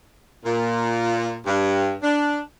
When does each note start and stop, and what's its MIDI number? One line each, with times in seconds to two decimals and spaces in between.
0.46 1.39 46
1.46 1.94 43
2.03 2.39 62